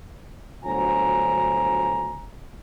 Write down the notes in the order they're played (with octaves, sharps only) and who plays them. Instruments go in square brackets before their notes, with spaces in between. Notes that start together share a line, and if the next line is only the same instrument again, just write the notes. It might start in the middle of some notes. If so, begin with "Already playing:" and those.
[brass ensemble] G1 D2 F#3 C5 G#5 A#5